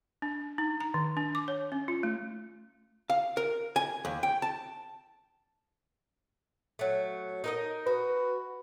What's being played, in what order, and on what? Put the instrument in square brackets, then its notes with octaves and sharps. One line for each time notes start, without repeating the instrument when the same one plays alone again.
[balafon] D4
D#4
A#5
D#3
D4
D6
C#5
C#4
F4
A3
[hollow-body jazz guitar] F5
A#4
G#5
D#2
G5
A5
[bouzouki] F#3 A3
D#4 A#4 D#5
[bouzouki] F#4 [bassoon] B4